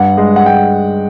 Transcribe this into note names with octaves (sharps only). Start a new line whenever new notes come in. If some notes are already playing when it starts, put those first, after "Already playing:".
Already playing: G2 F#5
G#3
F#5
G#3 G5